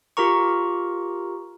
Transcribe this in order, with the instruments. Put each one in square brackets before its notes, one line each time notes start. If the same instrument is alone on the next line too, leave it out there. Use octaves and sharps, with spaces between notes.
[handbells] F4 G4 A#4 A#5 C#6